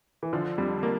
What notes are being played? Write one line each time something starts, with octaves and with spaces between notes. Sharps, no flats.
E3
D3 F3
F2 G3
F3 A#3